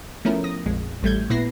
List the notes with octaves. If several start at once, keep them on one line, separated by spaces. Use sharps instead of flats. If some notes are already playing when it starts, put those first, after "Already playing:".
F3 A3 B3 C#4 E4 A#4
D#6 A#6
A#1 F2 G#3
A1 G3 A3 G6 G#6
A#2 B3 E4 B4 A#6 C7